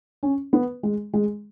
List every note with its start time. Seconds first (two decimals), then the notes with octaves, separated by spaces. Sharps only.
0.23 C#4
0.53 B3
0.83 G#3
1.13 G#3